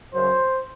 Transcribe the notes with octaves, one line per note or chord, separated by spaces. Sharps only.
F#2 C#3 F#3 C5